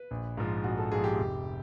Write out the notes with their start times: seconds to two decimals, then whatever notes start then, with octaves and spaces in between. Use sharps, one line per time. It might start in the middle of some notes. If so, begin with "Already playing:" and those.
Already playing: B4
0.11 A#1
0.37 G#2 F3
0.64 A#1 F#4
0.78 A4
0.92 G#2 F3 G#4
1.04 G4
1.18 F1